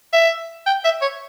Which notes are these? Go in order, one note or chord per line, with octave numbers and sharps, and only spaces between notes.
E5
G5
E5
C#5